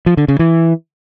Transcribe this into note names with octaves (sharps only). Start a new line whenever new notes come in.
F3
D3
C#3
E3